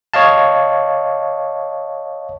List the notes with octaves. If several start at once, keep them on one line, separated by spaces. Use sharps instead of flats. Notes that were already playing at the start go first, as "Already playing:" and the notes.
C#5 D#5 F5 A5